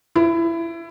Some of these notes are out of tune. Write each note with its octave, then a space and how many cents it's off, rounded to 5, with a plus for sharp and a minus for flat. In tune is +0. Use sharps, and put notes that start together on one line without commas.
E4 +20